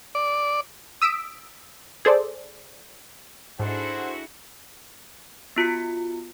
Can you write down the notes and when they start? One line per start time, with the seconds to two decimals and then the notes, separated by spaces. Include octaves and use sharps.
0.15 D5
1.02 D#6 E6 B6 D7
2.05 G#4 A4 C5 D5
3.60 G#2 D4 E4 F#4 G#4 A4 C5 F#5
5.56 B3 F4 F#4 C#7